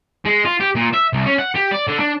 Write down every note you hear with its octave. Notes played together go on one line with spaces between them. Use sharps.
G#3
F4
G4
A#2
E5
C2
C#4
F#5
G4
D5
D3
D4